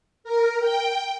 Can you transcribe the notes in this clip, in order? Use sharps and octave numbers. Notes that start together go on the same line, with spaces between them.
A#4
G5